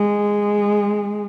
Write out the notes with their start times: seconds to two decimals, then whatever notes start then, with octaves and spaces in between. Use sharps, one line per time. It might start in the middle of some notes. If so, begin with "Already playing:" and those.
Already playing: G#3